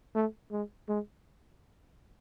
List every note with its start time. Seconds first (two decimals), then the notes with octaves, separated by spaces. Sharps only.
0.15 A3
0.51 G#3
0.88 G#3